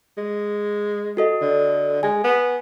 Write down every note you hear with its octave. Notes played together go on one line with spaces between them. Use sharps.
G#3
F#4 A4 D#5
D3
G#3 G#5
B3